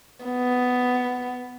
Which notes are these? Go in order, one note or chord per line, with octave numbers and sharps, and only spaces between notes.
B3